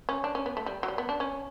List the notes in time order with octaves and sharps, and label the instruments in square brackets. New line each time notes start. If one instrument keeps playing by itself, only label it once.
[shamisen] C#4
D4
C#4
B3
A3
G3
F#3
G3
B3
D4
C#4